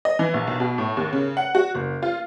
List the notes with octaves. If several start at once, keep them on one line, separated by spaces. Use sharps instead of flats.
D#5
E3
A#1
B1
B2
A2
D#2
C#3
F#5
F#4
F#1
F4